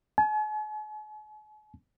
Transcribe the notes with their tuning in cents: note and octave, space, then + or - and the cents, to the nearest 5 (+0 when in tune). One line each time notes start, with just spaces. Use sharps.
G#5 +45